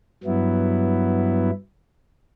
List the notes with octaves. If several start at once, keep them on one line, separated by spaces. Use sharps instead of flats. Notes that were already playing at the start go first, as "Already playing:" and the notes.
G2 F#3 B3 E4